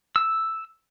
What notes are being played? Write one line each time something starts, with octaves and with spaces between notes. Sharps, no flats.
E6